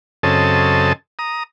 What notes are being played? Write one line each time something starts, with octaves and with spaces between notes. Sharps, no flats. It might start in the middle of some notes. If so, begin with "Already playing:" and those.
F#2 C#3 C4 A4 D#5 A5
A#5 D#6